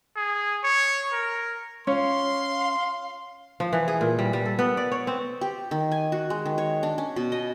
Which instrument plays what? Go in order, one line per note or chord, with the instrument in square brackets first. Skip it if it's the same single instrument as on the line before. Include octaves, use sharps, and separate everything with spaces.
[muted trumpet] G#4
C#5
A#4
[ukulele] C#4 [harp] F4 C#5 [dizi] F5 [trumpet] C6
[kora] F3
E3
G#4
A#2
G3
G3
A4
B3
D5
C#5
C4
[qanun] G4
D#3
G#5
F#4
G#3
D#3
C#5
D4
C#4
B2
D#5